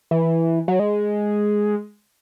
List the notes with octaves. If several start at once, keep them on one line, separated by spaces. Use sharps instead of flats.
E3
F#3
G#3